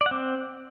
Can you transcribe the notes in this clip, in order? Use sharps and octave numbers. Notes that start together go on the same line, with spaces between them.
D5
F#5
C4